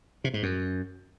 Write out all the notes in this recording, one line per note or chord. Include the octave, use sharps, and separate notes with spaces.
C3
G#2
F#2